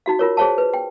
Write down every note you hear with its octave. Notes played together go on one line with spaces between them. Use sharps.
D#4 F#4 F5
F4 A#4 C#5
G#4 C5 C#5 F5 A5
B4
G5